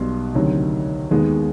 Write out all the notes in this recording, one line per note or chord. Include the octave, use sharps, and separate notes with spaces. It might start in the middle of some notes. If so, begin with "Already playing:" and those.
Already playing: B1 B2 G3 B3 C6
D2 C3 D#3 F#3
D#2 D#3 G#3 B3